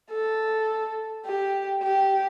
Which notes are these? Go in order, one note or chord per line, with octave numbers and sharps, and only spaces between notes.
A4
G4
G4